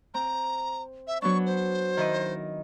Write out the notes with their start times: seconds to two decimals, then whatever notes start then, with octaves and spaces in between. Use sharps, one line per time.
0.14 C4 A#5
1.07 E5
1.22 F#3 B3 D4 C#6
1.46 C5
1.97 D#3 E4 D#5